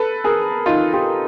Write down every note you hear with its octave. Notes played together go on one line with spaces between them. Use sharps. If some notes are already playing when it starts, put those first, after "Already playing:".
Already playing: A4 B4
G#4 A#4
D#4 F4
F4 G4